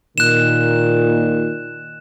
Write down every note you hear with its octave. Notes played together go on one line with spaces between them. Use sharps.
A#2 D#3 F#6 E7